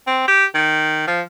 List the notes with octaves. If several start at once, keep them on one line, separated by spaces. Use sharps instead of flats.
C4
G4
D#3
F3